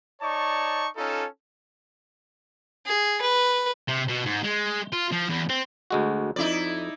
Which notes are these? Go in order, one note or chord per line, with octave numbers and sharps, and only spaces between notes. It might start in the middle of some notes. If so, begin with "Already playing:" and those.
D#4 C#5 D5 A5 C#6
C#4 D#4 F4 A4
G#4
B4
C3
B2
G#2
G#3
F4
F3
E2
C4
D2 G#3 F#4
F2 D#4 E4 D5